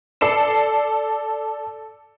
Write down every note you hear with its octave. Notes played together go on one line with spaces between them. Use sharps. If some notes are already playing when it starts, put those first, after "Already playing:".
A4 D5 C7 E7